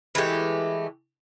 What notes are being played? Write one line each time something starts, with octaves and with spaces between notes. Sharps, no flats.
E3 G#3 A3 G4